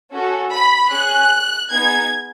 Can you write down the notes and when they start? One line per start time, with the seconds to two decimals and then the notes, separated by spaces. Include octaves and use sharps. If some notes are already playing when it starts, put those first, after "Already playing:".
0.13 C#4 F#4 A4
0.53 B5
0.92 C#4 G#4 F#6
1.72 B3 D#4 G#4 G#6